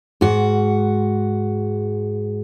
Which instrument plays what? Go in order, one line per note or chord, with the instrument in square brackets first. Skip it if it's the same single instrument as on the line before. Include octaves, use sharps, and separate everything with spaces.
[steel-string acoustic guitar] G#2 F#4